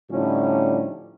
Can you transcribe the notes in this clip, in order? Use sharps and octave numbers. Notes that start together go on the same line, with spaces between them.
A2 D3 F3 G3 C#4 D#4